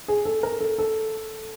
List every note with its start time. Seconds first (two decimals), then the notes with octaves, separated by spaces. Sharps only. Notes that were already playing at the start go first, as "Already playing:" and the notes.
0.08 G#4
0.25 A4
0.43 A#4
0.60 A4
0.78 A4